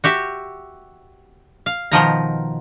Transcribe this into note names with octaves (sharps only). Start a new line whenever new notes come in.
F#4 G4 E5
F5
B2 D#3 F3 A#5